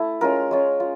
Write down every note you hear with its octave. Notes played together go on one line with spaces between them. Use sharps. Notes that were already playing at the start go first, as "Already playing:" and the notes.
Already playing: A3 E4
G#3 C#4 F4 A#4
G#3 C#4 F4
F4